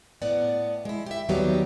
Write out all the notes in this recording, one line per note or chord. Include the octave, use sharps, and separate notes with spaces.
A2 B3 D5 F#5
G#3 E4
G4 E5
D#2 D#3 F#3 G3 B3 G4